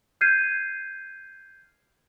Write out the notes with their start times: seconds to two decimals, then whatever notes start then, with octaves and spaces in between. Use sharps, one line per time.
0.21 F6 G6 G#6 C7 D#7